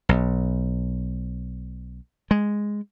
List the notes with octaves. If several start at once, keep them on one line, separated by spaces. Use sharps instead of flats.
B1
G#3